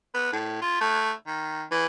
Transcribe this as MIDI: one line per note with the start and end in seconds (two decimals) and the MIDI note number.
0.14 0.32 59
0.32 0.57 45
0.61 0.80 65
0.80 1.11 57
1.27 1.64 51
1.71 1.86 52